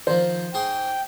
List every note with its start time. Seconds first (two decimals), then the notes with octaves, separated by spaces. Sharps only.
0.07 D#3 F3 C5
0.54 G#2 G#4 G5 C6